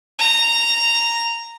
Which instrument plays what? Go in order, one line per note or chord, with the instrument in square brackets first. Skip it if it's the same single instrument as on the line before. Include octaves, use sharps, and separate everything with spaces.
[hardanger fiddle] A#5